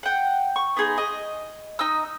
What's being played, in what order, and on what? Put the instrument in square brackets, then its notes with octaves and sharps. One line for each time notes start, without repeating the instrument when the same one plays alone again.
[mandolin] F#5 G5
C#6
B3 D#4 G#4 C6
D#5
D#4 D#5 E6